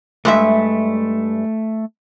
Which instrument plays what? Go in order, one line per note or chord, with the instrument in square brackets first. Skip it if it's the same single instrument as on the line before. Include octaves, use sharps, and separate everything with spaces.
[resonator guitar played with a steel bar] G2 G#3 E5 [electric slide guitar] A3